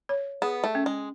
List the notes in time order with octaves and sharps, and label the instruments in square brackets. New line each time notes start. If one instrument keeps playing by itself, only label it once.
[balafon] C#5
[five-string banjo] B3 [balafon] G#4
[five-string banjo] A3
[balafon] C#4
[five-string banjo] G#3